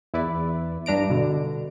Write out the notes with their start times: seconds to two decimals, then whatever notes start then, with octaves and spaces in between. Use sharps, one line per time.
0.14 E2 E4 B4 D5
0.86 G2 D4 A#5 D7
1.10 B2 D3